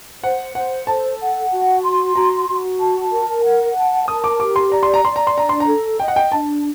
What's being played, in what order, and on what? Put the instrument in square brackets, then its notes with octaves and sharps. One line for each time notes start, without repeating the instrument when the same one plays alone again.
[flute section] C5 [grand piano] F#5
[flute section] C5 [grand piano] F#5
[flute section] A4 [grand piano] A5
[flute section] F#5
F#4
C6
[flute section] F#4 [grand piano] A#5
[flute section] F#4
A5
A#4
F#5
A5
[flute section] A#4 [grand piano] D#6
[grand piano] D6
[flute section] G4 [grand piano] D6
[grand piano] C6
[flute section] D5 [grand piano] A#5
[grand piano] C6
A#5
[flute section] D5 [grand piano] C6
[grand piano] A#5
C6
[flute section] D4 [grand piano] A#5
[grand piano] C6
A#5
[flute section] A4
[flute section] D#5 [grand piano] G5
[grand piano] F#5
G5
[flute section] D4 [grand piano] A5